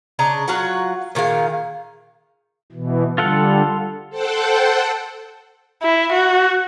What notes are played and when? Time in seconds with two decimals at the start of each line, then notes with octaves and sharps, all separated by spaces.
0.19 C#3 D4 D#5 A#5
0.48 F#3 F4 F#4 F#5
1.15 A#2 D#3 G#3 F5
2.72 B2 E3
3.18 D3 G3 F4 A4 F#5
4.10 A4 C5 F#5 G5 A5
5.82 E4
6.12 F#4